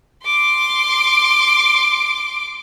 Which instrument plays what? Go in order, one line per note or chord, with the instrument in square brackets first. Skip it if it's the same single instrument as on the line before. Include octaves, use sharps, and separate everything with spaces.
[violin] C6 D6